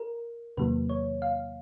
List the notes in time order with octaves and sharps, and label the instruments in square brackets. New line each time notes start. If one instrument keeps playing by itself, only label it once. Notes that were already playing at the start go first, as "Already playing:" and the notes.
Already playing: [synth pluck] A#4
E2 C3 D#3 F#3 A#3 B4
C#5
F5